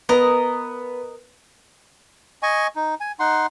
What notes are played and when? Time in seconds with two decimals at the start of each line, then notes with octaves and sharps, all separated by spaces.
0.09 B3 A#4 D#5
2.43 D#5 G#5 C#6
2.76 D#4
3.00 G#5
3.20 D#4 F#5 C6